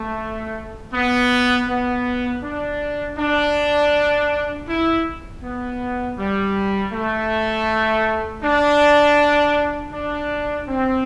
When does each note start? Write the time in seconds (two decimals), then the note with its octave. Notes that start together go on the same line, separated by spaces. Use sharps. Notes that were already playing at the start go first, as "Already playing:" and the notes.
Already playing: A3
0.93 B3
1.68 B3
2.43 D4
3.18 D4
4.68 E4
5.43 B3
6.18 G3
6.92 A3
8.42 D4
9.93 D4
10.68 C4